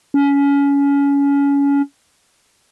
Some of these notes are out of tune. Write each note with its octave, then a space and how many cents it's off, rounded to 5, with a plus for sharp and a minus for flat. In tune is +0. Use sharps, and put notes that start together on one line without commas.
C#4 +25